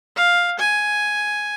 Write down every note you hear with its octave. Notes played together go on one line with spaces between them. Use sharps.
F5
G#5